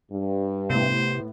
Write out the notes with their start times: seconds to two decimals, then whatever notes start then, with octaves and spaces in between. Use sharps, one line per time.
0.11 G2
0.70 A2 C3 B3 C5